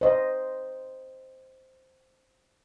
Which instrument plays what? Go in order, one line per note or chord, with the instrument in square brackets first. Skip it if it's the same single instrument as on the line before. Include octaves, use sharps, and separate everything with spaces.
[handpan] C5 D#5